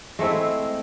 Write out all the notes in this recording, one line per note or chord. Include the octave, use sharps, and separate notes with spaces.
G#3 A3 C4 E4